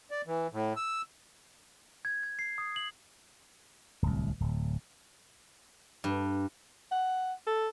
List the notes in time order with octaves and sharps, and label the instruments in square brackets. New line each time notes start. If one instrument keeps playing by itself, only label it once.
[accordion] D5
E3
A2
E6
[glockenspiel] G#6
G#6
C7
D#6
F#7
[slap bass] D1 C2
D1
[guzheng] G2
[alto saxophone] F#5
A4